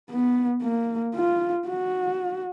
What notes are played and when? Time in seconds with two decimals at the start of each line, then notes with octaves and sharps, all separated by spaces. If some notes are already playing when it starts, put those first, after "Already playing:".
0.10 B3
0.63 A#3
1.16 F4
1.68 F#4